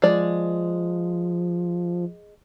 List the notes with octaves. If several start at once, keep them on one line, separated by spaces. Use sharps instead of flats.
F3 G#3 D5